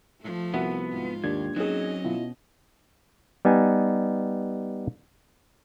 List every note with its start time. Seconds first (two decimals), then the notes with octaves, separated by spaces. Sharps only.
0.21 F3 A3
0.54 C2 B3 F#4 E5 F#5
0.90 G#2 F4
1.24 D#2 A#3 D4 G4 G#6
1.56 F#3 C4 C#4 D#4 G#4 D#5
2.05 B2 E4 F4
3.45 G3 B3 D#4 G#5